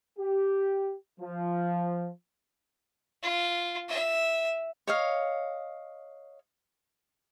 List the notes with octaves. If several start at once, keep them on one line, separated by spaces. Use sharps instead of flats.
G4
F3
F4
E5
C#5 D#5 F5